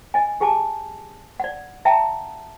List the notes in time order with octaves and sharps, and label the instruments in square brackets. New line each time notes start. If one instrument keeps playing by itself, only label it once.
[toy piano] D#5 G#5
G4 G#4 G#5 A5 D6
D5 F#5
E5 F#5 G5 A5 A#5